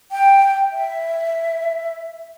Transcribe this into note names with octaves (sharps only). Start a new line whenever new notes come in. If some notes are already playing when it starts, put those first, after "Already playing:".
G5
E5